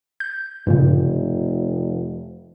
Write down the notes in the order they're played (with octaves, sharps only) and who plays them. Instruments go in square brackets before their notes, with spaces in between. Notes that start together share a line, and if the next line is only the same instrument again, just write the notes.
[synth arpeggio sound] G6
[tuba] F1 [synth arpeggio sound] G2 A#2 C#3